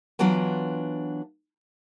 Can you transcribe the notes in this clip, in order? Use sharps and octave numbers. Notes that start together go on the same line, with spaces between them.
E3 F#3 B3 D4 F4